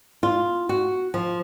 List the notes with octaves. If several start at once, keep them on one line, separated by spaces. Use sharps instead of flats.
F4
F#4
F3